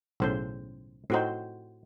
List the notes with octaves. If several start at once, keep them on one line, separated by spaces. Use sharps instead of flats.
B1 A2 C#3 A4 C5
A2 C4 D#4 F#4 C5